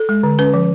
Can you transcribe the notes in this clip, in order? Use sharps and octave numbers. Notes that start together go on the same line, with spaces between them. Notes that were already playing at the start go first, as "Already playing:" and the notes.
Already playing: A4
G#3
D3
C#4 B4
F3